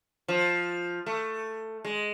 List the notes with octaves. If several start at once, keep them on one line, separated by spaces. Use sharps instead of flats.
F3
A3
G#3